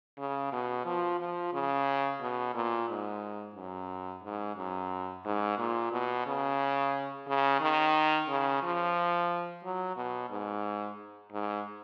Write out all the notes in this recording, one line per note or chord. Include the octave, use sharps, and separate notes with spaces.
C#3
B2
F3
F3
C#3
B2
A#2
G#2
F#2
G#2
F#2
G#2
A#2
B2
C#3
C#3
D#3
C#3
F3
F#3
B2
G#2
G#2